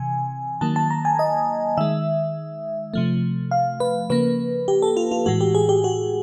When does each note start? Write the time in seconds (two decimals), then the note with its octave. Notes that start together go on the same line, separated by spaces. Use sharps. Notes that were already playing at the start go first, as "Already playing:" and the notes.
Already playing: C3 E3 G#5
0.61 D#3 F#3 A#3 A5
0.76 A5
0.91 A#5
1.05 G#5
1.19 D#5
1.77 D#3 G#3 E5
2.94 C3 F3 A3
3.51 F5
3.80 B4
4.10 C#3 F3 A#3 B4
4.68 G4
4.82 A4
4.97 F4
5.11 F4
5.26 A2 E3 G#3 F#4
5.41 G4
5.55 G#4
5.69 G4
5.84 F#4